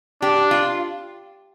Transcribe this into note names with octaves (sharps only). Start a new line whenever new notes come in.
D4 G4
F4